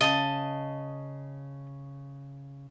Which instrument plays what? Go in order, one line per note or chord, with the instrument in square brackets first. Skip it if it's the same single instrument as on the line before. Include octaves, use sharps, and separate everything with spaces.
[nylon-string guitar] C#3 [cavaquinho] D#5 A5 D#6